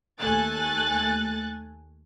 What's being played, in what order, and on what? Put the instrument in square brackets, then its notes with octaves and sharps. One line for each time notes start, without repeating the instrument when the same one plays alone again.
[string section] D#2 A3 A4 G#5 F#6 A6